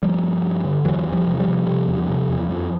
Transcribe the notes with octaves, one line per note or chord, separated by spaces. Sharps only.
G2 F3 G3
G2
G2
D3
E2 E3 F#3
E2
F3 G3
C3
F3 G3
C3
C3
E2
C3
E2
F2